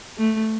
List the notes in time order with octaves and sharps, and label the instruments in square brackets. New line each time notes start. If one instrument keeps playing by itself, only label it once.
[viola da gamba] A3